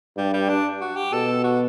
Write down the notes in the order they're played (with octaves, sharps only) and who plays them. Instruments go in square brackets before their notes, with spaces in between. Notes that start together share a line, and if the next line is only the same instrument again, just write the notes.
[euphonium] G2 [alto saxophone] G3
[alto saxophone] G3
D4
F#4
G4
[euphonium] B2 [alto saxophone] A4
[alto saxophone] F#4